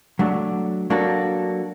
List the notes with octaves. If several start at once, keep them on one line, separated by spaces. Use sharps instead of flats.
F#3 A3 D4
F#3 A#3 D4 F#4 A4